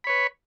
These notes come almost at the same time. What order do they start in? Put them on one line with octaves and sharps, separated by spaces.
B5 C#5 B4